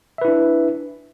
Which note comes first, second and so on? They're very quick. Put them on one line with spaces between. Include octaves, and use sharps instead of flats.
E5 B4 E4 D4